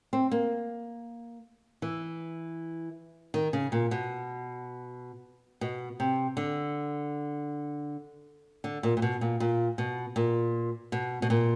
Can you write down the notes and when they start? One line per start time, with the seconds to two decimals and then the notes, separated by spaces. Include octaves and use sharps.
0.13 C4
0.31 A#3
1.82 E3
3.34 D#3
3.53 C#3
3.72 A#2
3.91 B2
5.61 B2
6.00 C3
6.37 D3
8.64 D3
8.83 A#2
8.97 A#2
9.02 B2
9.21 A#2
9.40 A#2
9.78 B2
10.16 A#2
10.92 B2
11.22 B2
11.30 A#2